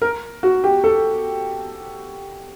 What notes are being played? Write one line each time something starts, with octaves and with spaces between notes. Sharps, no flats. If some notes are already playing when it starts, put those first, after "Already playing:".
A#4
F#4
G4
A4